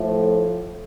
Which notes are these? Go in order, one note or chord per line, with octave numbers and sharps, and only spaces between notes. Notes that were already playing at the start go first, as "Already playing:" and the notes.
Already playing: A2 F3 A3